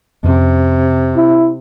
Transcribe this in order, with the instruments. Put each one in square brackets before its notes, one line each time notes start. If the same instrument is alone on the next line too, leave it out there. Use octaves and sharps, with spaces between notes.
[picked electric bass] F2 B3 C#4 [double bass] C3
[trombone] E4